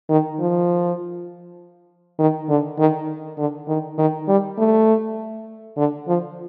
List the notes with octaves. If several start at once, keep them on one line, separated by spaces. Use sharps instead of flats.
D#3
F3
D#3
D3
D#3
D3
D#3
D#3
G3
A3
D3
F3